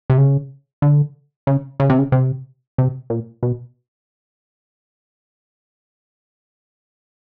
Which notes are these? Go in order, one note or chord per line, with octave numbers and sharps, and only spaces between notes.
C3
C#3
D3
C#3
C#3
C3
C#3
C3
C3
A#2
B2